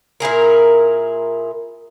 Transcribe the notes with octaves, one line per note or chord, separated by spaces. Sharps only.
A#2 E4 G#4 A#4